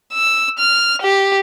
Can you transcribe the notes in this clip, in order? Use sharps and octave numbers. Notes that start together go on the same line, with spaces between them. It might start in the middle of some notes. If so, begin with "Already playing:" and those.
E6
F6
G4